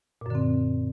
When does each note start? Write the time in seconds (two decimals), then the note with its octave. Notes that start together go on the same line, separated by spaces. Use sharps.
0.21 A#2
0.26 F#2
0.30 D3
0.35 C4